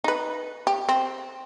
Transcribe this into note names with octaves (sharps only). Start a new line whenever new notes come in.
D#4 B4
G4
C4